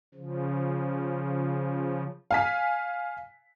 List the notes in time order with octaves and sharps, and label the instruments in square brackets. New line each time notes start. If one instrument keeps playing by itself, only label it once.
[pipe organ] C#3 F3
[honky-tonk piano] F5 G#5 B6